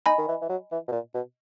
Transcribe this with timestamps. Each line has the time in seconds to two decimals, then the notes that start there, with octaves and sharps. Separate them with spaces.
0.06 D#4 D#5 G#5 B5
0.18 D#3
0.28 E3
0.42 E3
0.49 F#3
0.72 E3
0.88 B2
0.92 A#2
1.14 B2